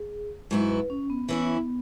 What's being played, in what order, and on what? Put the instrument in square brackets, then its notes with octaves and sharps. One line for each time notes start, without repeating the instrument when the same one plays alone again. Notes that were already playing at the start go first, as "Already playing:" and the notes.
Already playing: [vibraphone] G#4
[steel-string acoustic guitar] G#2 F#3 B3 E4
[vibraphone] B4
C#4
B3
[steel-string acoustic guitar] E3 C#4 E4 [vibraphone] B3